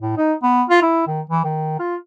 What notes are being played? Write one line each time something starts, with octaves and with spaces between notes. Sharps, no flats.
A2
D#4
B3
F4
E4
D#3
E3
D#3
F4